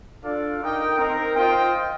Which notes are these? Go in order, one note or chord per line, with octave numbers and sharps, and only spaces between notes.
D4 F4 A4 D5 F5
D#4 A#4 D#5 G5
C4 D#4 A#4
F4 C5 D#5 G5